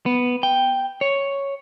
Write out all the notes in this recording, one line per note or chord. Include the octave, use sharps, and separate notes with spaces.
B3
G5
C#5